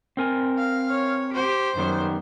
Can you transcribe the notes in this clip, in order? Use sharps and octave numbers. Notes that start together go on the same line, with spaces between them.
C4 A#4 G#5
F5
C#5
G4 C5
F#2 D#3 G3 B3